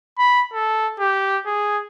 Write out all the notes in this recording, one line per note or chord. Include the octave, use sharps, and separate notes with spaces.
B5
A4
G4
G#4